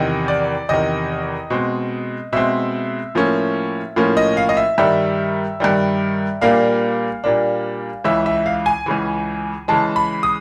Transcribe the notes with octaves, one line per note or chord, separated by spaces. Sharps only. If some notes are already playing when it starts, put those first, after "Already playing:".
Already playing: E2 C3 D#3 D#5
D5
E2 C3 D#3 D#5
B2 G#3 C4
B2 G#3 C4 E5
A2 F3 A#3 C#4
A2 F3 A#3 C#4
D#5
F5
D#5
E5
G2 D#3 G3 E5
G2 D#3 G3
A#2 G3 A#3 D4 F5
A#2 G3 A#3 D4
C#2 C#3 E3 E5
E5
F5
G#5
C#2 C#3 E3
C#3 E3 G#3 A5
B5
D#6